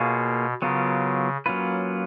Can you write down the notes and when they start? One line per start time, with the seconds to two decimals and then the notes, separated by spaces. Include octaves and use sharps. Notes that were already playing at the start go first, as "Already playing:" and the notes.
Already playing: B2 A#3 F4 G#4 C#5
0.62 C#3 F#3 B3 F4 A#4
1.46 F#3 A#3 C#4 F4 B4